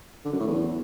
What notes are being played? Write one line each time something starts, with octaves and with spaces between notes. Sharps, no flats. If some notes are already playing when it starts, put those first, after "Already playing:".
D3
F#2
A2
E2